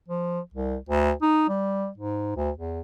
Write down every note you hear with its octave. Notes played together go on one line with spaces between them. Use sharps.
F3
C2
D2
D#4
G3
G#2
D2
E2